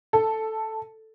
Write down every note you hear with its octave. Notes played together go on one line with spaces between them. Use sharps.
A4